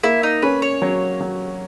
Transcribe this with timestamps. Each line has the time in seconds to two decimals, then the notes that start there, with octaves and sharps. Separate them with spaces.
0.03 A#3 E4
0.23 D#4
0.42 C#4 B4
0.62 C#5
0.82 F#3
1.20 F#3